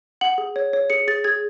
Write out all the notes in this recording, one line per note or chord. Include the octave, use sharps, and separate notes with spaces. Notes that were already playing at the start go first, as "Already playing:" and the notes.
F#5 F#7
G#4
C#5
C#5
G#4 C#7
G#4 A6
G#4 G#6